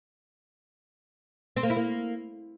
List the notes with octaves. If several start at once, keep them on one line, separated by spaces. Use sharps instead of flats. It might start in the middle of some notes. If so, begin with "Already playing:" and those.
C4
A#3
E4
A#3